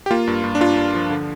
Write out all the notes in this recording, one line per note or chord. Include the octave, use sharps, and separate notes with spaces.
G4
A#3 F4
G2
G2
D4
G2 F4
G2
F3
D3